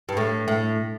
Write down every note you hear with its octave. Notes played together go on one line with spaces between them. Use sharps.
G2
A2
A2